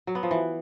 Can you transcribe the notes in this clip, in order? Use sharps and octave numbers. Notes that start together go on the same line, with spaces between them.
F#3
B3
F3
E3